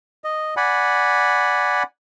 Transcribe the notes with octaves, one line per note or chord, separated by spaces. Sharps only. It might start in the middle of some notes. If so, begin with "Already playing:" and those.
D#5
D5 F#5 G#5 B5